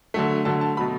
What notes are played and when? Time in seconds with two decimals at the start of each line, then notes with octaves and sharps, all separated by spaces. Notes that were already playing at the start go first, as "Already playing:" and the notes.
0.14 D3 F#3 A3
0.45 D3 F#3 A3 A5
0.61 A5
0.77 B2 F#3 A3 B5